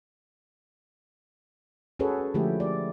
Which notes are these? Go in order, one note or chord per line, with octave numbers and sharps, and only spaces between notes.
C#4 F#4 G#4 A4 B4 C#5
D3 F3 G#3 A3 E4 G4
D5